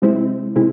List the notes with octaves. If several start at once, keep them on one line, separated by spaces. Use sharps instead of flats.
C3 G#3 C4 E4
C3 G#3 C4 E4